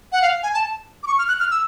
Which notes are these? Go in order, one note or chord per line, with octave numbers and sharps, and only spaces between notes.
F#5
F5
G#5
A5
D6
C#6
F6
F#6
F6
E6